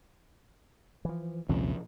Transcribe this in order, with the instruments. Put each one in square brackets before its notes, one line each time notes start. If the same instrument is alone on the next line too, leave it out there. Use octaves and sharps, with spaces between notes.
[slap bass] E3 F3
[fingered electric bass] A#1 C3 F3 [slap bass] D#2 G#3 C#4